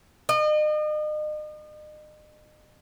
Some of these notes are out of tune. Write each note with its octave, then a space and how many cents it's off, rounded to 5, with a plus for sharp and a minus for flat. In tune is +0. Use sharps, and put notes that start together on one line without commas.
D#5 -40